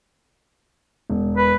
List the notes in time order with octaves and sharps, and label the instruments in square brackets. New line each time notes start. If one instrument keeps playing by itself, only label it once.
[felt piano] E1
[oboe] B4